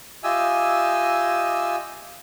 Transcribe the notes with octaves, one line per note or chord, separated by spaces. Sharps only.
F4 G4 D#5 E5 G#5 E6